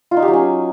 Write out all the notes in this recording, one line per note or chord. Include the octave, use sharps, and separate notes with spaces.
F4
D#4
G4
F#3
C#4